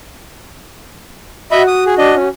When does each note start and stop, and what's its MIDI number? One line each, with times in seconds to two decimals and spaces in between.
1.51 2.26 66
1.51 1.62 75
1.51 1.62 76
1.51 1.62 83
1.68 1.84 87
1.86 1.95 68
1.98 2.15 62
1.98 2.15 75
2.15 2.29 61